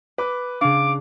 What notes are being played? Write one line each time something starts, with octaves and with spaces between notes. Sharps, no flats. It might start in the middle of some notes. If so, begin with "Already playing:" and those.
B4 D6
C#3 D4 F5 D6